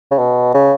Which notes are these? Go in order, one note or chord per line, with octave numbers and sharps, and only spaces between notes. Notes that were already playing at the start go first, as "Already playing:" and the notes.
C#3
B2
C#3